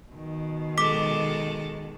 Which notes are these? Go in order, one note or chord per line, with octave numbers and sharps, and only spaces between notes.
B2 D#3
G#3 A4 D6 B6